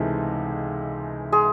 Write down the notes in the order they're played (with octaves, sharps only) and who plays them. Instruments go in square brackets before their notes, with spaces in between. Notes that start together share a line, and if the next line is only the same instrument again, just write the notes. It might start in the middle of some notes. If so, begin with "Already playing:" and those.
Already playing: [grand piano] C#2 C3 E3 G#3 D#4 [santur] A3
[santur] G#3 G#4